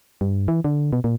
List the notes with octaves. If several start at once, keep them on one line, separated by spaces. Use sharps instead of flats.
G2
E3
D3
B2
A#2